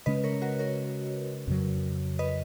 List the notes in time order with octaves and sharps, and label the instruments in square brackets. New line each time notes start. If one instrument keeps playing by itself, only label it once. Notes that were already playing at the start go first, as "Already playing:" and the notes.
[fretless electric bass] C#3 G#3 C#4 [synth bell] B4 D#5
[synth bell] A#4 C#5
F#4 A#4
A#4 C#5
[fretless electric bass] F2 C#3 F#3
[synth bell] B4 D#5